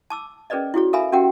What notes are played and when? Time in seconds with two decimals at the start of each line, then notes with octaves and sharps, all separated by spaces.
0.10 A5 D6 E6
0.50 C#4 G#4 A#4 B4 D5 D#5
0.74 E4 F#4 G#4 C#5
0.93 A4 A#4 E5 F5 G#5 B5
1.12 C#4 F#4 G4 A#4 F#5 G5